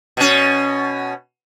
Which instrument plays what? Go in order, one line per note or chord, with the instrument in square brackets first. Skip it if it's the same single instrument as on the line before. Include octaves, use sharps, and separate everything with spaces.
[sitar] B2 C#4